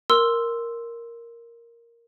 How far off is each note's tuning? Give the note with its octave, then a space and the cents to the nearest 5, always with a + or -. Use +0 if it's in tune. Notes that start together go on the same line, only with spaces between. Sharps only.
A#4 +0 C6 +0 E6 +0